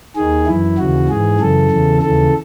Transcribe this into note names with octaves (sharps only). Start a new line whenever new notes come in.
D#2 D#3 G#4
F#2 E3 E4
D#2 C#3 E3 F#4
G#2 E3 G#4
F#2 C#3 E3 A4
E2 C#3 E3
D#2 C#3 E3 A4